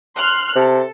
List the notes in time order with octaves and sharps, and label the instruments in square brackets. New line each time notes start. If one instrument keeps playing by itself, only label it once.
[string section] C6 F6 F#6
[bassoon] C3 [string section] A4